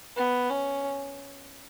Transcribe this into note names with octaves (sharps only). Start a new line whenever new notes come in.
B3
C#4